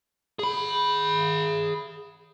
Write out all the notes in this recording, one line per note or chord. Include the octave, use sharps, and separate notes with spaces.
G#4 B5